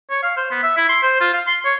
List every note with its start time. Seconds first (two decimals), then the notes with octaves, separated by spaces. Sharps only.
0.10 C#5
0.23 F5
0.37 C5
0.51 B3
0.63 E5
0.77 E4
0.89 C6
1.03 C5
1.20 F4
1.34 F5
1.47 C6
1.65 C#5